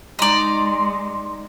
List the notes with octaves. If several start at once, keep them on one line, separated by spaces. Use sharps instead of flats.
G#3 D#4 D5 C6